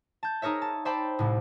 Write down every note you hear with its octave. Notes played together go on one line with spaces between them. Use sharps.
A5 G6
D#4 G#4 A#4 C#5 E5
A5
C5 D5 E5 G5 A5 B5
C2 A2